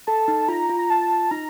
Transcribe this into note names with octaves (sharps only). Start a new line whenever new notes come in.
A4 A5
D#4
F4 A#5
F4
A#5
A5
D#4 A#5